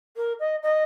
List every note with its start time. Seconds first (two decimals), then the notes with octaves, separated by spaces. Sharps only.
0.17 A#4
0.40 D#5
0.62 D#5